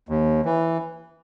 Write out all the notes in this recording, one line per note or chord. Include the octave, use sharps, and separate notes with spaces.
D#2
E3